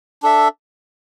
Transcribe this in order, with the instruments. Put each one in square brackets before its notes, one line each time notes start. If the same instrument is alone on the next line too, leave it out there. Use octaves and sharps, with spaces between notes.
[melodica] D4 A4 E5